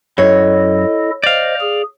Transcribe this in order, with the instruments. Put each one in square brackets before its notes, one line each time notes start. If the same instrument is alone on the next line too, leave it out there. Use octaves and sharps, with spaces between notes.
[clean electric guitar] F#2 [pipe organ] E4 A4 D#5 [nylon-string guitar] C#5
[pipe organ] C5 D#5 [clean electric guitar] D5 F5
[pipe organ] G#4